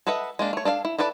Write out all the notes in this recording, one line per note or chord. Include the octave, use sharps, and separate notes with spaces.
A4 B4 D#5 E5 F#5
G#3 A#3 D4
A3 C#5
D4 A4 E5 F5
E4
E4 A4 B4 D5